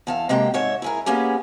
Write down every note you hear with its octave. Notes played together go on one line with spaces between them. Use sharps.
E2 A4 F5
C3 G#3 A#3 G4 G5
G#2 C#5 E5
E4 G#4 A#4
A#3 B3 C#4 G4 G#4